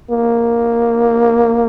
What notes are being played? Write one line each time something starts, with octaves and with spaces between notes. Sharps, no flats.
A#3